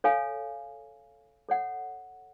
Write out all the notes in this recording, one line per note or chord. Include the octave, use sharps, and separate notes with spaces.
A4 C#5 F5 G#5
A4 C#5 F#5